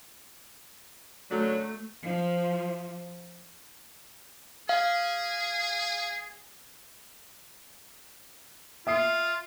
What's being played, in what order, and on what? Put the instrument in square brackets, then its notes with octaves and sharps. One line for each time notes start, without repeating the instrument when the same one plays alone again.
[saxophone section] F#2 D3 F#3 [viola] A3
[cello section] F3
[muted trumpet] G#4 [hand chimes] F5
[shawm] F4 [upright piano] E5 D#6 C7